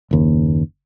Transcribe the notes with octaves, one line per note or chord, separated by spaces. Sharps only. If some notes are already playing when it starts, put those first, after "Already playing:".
F#1 D#2